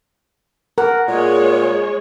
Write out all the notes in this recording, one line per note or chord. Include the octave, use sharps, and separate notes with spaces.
A#4 F#5
A#2 G#3 C#5